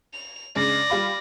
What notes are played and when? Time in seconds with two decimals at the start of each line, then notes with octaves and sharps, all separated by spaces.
0.13 F7
0.55 C#3 G#3 D4 D5 A#6
0.90 G3 F4 B5